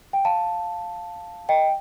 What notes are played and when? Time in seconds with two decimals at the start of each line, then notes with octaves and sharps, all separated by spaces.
0.13 G5
0.25 F5 A5
1.49 D#5 G5